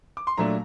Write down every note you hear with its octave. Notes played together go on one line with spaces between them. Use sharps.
D6
C6
A#2 F#3 A3 D4 A#5